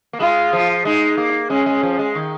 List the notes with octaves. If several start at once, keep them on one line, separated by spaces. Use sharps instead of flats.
A#3
G#3 F4
F3
G#3 D#4
A#3
G#3 C#4
G#3
F3
G#3
D#3